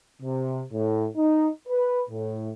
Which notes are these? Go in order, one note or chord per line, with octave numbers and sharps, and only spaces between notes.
C3
A2
D#4
B4
A2